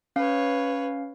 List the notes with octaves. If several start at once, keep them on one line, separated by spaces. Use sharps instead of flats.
C#4 B4 C#5 F5